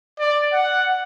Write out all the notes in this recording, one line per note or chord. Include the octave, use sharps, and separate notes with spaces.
D5
F#5